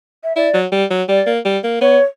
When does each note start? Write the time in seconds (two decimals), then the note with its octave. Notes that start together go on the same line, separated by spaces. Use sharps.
0.24 E5
0.36 E4 D5
0.54 F#3
0.72 G3
0.90 F#3
1.08 G3 D5
1.26 A#3
1.45 G3
1.63 A#3
1.81 B3 C#5